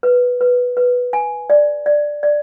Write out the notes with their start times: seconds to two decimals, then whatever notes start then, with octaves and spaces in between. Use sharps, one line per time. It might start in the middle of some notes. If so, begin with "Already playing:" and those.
0.03 B4
0.41 B4
0.77 B4
1.13 G#5
1.50 D5
1.86 D5
2.23 D5